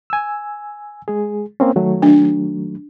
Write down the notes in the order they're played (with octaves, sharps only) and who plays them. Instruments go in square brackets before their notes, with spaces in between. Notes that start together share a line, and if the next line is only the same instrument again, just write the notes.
[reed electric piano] G#5 E6
G#3 G#4
A#3 C4 C#4
D#3 F#3 A3
[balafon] D4